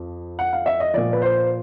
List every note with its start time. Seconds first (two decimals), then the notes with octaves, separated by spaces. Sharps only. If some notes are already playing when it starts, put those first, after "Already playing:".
Already playing: F2 F3
0.39 F#5
0.53 F5
0.66 E5
0.80 D#5
0.94 A#2 F3 D5
1.13 B4
1.22 C5